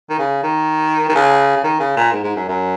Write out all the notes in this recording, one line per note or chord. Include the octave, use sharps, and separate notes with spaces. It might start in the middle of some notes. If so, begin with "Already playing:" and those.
D#3
C#3
D#3
D#3
C#3
C#3
D#3
C#3
A#2
G#2
G#2
F#2
F#2